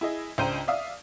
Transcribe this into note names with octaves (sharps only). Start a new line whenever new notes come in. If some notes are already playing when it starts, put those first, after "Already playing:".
E4 G#4 D#5
C#2 D4 C5 G5 A#5 D#7
D5 E5 F5 D#6